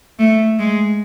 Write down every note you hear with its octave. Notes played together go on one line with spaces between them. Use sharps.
A3
G#3